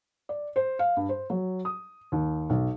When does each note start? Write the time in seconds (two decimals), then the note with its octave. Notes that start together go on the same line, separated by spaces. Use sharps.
0.29 D5
0.56 C5
0.79 F5
0.97 G2
1.09 C5
1.30 F#3
1.65 D#6
2.12 D#2
2.50 B1